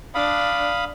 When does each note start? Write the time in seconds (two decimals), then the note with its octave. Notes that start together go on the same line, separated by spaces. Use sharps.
0.15 D4 F5 B5 D#6